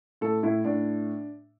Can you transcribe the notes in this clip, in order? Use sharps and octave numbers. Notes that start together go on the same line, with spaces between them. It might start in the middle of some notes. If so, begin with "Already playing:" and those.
A2 A4
A2 E4
A2 D4